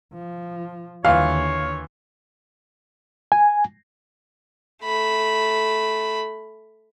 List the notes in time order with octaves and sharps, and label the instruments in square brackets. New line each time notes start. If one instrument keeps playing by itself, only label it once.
[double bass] F3
[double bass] D#2 D3 [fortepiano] E3 F4 [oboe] C#5 [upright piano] F5
[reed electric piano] G#5
[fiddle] A3 B5